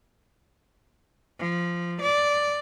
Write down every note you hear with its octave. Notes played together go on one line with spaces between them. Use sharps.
F3
D5